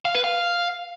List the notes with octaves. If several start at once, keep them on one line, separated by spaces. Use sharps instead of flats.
F5
B4
F5